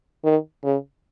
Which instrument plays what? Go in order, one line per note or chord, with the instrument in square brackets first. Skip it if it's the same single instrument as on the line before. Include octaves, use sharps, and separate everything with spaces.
[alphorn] D#3
C#3